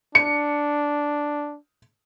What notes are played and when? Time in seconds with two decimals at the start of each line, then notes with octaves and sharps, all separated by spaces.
0.15 D4 C#7